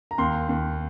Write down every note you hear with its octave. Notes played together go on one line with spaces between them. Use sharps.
A#5
D#2 C6
D#2